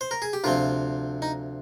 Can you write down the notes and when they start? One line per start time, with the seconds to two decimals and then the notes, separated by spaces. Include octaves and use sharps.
0.01 C5
0.11 A#4
0.22 G#4
0.33 G4
0.44 D2 C3 F3 C4 F4
1.22 D#4